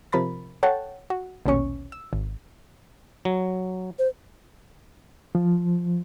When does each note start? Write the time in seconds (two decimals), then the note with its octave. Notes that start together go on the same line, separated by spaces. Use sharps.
0.12 C3 F3 A#4 B5 A6
0.63 A4 C#5 F#5 G5 A5
1.10 F#4
1.46 A#1 D#2 B2 C#4 C#6
1.92 E6
2.13 G#1
3.25 F#3
3.99 C5
5.35 F3